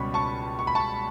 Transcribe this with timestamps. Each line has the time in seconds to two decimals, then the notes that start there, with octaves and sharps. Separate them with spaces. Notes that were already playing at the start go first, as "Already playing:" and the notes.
Already playing: C#2 B2 G3 C#4 B5 C#6
0.14 A5 C#6
0.59 C#6
0.67 B5
0.75 A5 C#6